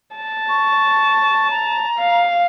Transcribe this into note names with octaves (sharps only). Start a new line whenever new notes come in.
A5
C#6
A#5
F5